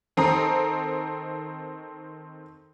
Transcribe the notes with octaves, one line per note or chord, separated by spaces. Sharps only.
D#3 C4 A4 A#5 D#6